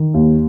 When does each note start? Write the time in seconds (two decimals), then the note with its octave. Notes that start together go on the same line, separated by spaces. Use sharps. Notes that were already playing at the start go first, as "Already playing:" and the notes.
Already playing: D#3
0.14 D#2